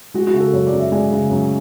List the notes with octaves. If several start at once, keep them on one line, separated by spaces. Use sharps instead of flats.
G#3 F#4
F#4
C#3
A4
F#2 C#5
D5
F#2
E5
G#3 D5
C#3
F#2